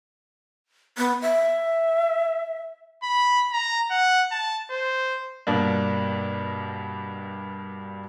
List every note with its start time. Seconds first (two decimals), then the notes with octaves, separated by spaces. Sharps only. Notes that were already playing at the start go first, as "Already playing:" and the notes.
0.98 B3
1.22 E5
3.03 B5
3.52 A#5
3.91 F#5
4.31 A5
4.71 C5
5.47 G2 B2 A#3 D4